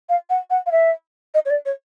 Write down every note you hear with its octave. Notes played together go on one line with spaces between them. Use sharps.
F5
F#5
F#5
F5
E5
D#5
C#5
D5
C#5